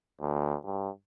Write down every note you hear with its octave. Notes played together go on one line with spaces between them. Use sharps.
D2
G2